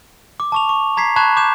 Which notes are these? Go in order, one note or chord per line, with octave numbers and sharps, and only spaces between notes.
D6
A5 C#6 F7
C#6
A#5 G#6 B6 C7
A5 B5 C#6 F#6 G#6 E7
D6 G6 E7